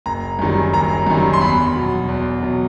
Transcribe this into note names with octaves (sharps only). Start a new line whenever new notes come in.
F#1 A#5
F#2 D#3 G3
F#1 A#5
F#2 D#3 G3
C6
E2 B5
B2 F#3
E2
B2 F#3